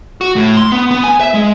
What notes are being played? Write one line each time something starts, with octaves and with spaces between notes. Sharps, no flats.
F#4
A2
C6
B3
B3
G#5
E5
G#3